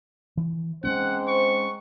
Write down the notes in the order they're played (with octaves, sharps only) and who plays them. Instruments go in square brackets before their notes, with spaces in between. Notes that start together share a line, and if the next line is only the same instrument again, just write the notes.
[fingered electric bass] E3
[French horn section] G#2 C4 C5 [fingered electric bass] G#3 A#3 C#4 [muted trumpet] F#5
[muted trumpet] C#6